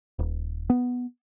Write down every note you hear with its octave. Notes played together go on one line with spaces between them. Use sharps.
D#1
B3